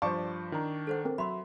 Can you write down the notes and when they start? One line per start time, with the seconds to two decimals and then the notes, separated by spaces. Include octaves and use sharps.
0.02 G2 F3 C5 D5 F5 A5 C#6 D6
0.52 D#3 D4 E4 A#5
0.87 A4 C5 F#5
1.05 C4 A#4
1.18 F#3 E5 B5 C6